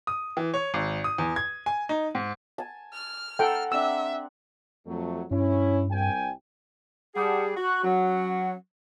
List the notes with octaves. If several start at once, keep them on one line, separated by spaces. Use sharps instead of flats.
D#6
E3
C#5
G#1
D#6
E2
G#6
G#5
D#4
G#2
G#5 A5
F6
A4 F#5 G5 A#5 C6
C4 D4 E5 E6
F2 F#3 A3
G2 C#4 E4
C2 G5 G#5
G3 G#4 F#5 A5 D#6
F#4 C#6 F#6
F#3 C#4 F#5